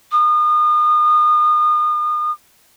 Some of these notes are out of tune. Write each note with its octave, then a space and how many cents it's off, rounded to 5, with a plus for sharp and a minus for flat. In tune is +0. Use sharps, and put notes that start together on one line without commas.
D#6 -35